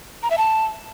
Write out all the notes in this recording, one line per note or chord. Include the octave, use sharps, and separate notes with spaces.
A#5
E5
A5